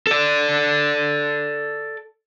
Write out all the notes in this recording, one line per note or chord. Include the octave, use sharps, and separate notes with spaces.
A4 D5